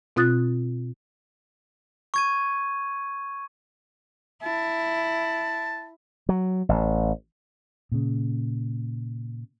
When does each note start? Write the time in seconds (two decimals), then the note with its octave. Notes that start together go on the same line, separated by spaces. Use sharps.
0.16 B2 C4 F4 D#6 F#6 A6
2.14 C#6 G#6 D#7
4.43 E4 A5
6.29 F#3
6.69 A1
7.92 A#2 C#3